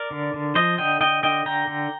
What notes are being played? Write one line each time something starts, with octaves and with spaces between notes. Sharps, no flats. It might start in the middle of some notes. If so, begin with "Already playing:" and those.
Already playing: A#4 D5
D3
D3
F3 C5 D#5
D3 D#5 G5
D3 D#5 G5
D3 D#5 G5
D3 G5 A#5
D3